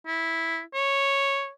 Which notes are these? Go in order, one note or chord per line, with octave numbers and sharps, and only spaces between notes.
E4
C#5